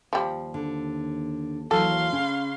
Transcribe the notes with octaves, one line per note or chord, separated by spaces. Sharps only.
D#2 F3 G3
D3
D#2 E3 F#3 A4 F5 C6
C#3 C#4